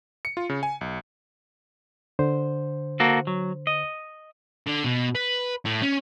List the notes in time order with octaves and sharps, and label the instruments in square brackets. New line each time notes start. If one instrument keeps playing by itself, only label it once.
[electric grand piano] C#7
F4
C#3
G#5
B1
[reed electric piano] D3 C5
[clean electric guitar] A#3 F#4 A4
F#3
D#5
[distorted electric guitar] D3
B2
B4
A2
C#4